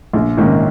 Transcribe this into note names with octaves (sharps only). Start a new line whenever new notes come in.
A#1
G#2 D#3 A#3 C#4